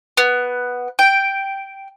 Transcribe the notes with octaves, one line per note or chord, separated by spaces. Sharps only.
B3
G5